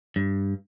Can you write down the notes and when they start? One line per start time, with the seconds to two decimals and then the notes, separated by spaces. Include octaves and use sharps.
0.16 G2